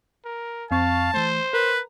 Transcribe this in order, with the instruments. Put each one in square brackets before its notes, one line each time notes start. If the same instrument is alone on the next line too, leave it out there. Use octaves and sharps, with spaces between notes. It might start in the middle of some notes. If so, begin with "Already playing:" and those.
[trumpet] A#4
[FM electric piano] F2 C4 C#6 [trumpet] F5 [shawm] A5
[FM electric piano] E3 A3 [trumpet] C5
[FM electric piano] A#4 [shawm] B4